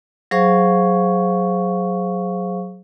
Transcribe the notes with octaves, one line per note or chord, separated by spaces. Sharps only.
F#3 G#4 C5 F5 C#6